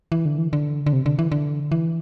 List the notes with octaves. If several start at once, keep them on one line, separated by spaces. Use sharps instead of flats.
E3
D3
E3
D3
D3
C3
D3
E3
D3
E3